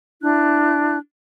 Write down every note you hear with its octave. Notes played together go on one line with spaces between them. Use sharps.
D4 E4 F#6